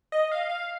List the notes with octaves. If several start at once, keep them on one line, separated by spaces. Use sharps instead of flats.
D#5
F5
F5